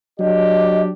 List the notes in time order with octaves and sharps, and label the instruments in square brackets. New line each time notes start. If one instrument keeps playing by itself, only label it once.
[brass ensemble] F#3 D4 G4 [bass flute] D#5